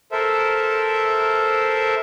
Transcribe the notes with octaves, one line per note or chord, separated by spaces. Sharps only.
A4 A#4 C5 E5